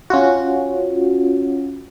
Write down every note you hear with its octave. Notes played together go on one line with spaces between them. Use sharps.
C#4 F4 F#4